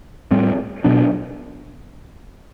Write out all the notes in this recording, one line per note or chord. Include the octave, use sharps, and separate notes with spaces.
A2 G3 C4
B2 F#3 B3 D4